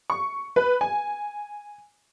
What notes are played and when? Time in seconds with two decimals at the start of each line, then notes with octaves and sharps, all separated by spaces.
0.10 C#6
0.56 B4
0.81 G#5